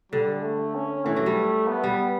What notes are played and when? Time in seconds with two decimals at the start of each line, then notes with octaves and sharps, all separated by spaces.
0.12 D3 G3
0.43 A3
0.75 C#4
1.05 E3 A3
1.16 F#3
1.26 G3
1.68 B3
1.84 G3